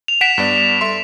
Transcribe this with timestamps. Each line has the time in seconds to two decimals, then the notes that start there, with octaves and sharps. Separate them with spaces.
0.08 F7
0.21 F#5 B6 D7 E7
0.38 G2 B3 D5
0.81 A4 E5 C6